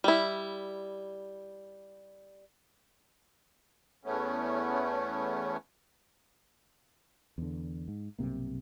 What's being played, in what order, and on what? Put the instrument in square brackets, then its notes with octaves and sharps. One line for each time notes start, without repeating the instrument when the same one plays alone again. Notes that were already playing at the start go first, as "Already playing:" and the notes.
[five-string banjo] G3 E4
[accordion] E2 A3 B3 C#4
[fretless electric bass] E2 D3
G#2
B1 G2 C3 A#3